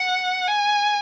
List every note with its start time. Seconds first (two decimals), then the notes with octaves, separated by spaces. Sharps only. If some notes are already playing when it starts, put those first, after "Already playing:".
Already playing: F#5
0.47 G#5